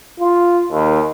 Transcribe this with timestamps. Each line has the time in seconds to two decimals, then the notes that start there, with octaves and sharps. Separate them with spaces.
0.20 F4
0.71 D#2